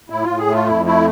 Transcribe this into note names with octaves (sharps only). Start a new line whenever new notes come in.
A2 E4
A2 F4
G#4
A3 F4
F2 E4
A3 E4